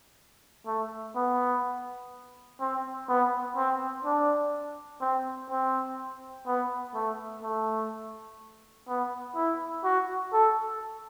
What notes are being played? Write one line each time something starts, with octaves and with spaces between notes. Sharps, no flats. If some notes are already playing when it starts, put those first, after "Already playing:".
A3
B3
C4
B3
C4
D4
C4
C4
B3
A3
A3
B3
E4
F#4
A4